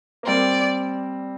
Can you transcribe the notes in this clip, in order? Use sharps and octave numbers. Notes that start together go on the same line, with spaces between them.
A#3
G3 C4 D5